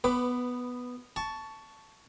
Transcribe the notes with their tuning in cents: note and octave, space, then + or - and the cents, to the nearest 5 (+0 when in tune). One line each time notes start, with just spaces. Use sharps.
B3 +0 B4 +15 D6 +0
A5 +0 C#6 +15